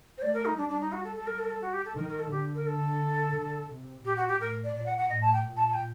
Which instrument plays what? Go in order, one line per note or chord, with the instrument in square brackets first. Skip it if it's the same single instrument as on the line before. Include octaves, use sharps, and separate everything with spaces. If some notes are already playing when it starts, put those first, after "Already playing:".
[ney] C5
[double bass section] A3 [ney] D5
[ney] A#4
D#4
[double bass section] G3 [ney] D4
[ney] D4
D#4
F#4
A4
A4
[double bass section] G3 [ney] A#4
[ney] A4
A#4
A4
F#4
G4
A4
[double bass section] D#3 [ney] A#4
[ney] A#4
A4
[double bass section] D3 [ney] G4
[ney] A#4
A4
[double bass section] D3
C3
[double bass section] A#2 [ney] G4
[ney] F#4
G4
[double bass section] A2 [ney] A#4
[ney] D5
[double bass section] A#2 [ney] D5
[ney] F#5
F#5
[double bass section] A2 [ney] D#5
[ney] A5
G5
[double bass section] A#2
[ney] A5
A5
G5